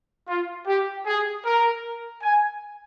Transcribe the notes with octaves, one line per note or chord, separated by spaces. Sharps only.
F4
G4
G#4
A#4
G#5